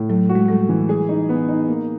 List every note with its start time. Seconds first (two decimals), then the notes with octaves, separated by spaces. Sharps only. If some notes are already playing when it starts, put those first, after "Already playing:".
Already playing: A2
0.09 F#3 A3
0.29 F#4
0.35 G#3
0.48 G3 A3
0.69 E3
0.89 G#4
1.09 D#4
1.29 B3
1.48 D#4
1.68 A#3